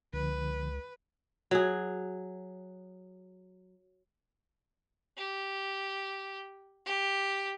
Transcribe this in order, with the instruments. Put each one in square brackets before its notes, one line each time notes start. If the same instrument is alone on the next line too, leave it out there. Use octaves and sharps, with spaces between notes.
[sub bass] C#2 [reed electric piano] D3 F3 [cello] B4
[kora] F#3 G#4
[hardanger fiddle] G4
G4